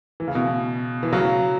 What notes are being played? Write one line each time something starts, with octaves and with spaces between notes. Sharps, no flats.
E3
C#3
B2 E3
E3
C#3 F#3